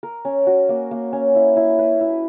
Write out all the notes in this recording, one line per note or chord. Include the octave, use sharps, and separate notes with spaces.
A#4
C#4
F#4
A#3
A#3
C#4
E4
E4
B4
E4